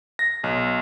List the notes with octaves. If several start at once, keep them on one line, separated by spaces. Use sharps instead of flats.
A#6
B1